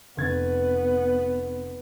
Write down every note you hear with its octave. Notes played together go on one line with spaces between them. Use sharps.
F1 B3 G#6 A6